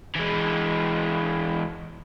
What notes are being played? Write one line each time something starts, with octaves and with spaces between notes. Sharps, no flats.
E3 G#3